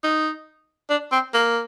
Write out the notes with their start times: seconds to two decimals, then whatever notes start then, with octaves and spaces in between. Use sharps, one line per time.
0.04 D#4
0.90 D4
1.12 C4
1.34 A#3